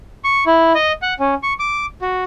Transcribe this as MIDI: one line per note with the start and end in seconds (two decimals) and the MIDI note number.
0.24 0.44 85
0.47 0.73 64
0.75 0.92 75
1.02 1.14 78
1.20 1.34 61
1.43 1.53 85
1.60 1.86 86
2.02 2.24 66